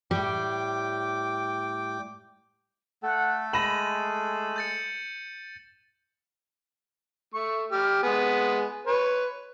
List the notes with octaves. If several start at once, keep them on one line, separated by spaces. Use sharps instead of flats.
A2 G3 G5 D6
A3 A4 F#5
G#3 B5 A#6 D#7 E7 F#7
G6 A6 C#7
A3 C#6
G4 F6
G#3 B3 G#4
B4 C#5